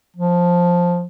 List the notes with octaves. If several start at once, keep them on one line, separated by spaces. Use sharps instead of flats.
F3